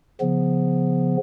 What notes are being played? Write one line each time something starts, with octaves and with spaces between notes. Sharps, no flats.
C#3 F3 B3